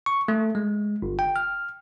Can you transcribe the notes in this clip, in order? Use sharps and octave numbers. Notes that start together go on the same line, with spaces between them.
C#6
A3
G#3
G1
G5
F6